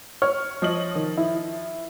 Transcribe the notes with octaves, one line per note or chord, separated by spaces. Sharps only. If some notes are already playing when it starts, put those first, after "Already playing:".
C#5 F6
F3 D#5 F#7
D#3
E4